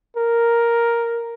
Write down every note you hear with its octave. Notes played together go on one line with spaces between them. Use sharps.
A#4